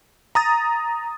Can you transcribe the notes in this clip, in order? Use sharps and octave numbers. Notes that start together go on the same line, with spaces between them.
A#5 D#6 A6